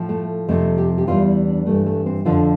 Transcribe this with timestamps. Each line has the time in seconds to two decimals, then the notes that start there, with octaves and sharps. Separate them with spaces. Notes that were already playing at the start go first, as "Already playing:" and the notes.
Already playing: A2 F3
0.09 A3
0.48 F2 C3 F3 A3
0.78 G4
0.98 G4
1.07 E2 E3 G3 F4
1.27 E4
1.47 D4
1.66 G2 E3 G3 A3
1.86 A3
2.06 C4
2.25 F2 D3 F3 F4